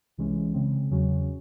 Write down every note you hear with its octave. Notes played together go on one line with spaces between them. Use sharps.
C2 C3 E3 G#3 C#4
C#3 G#3 C4
E2 C#3 F#3 C#4 F#4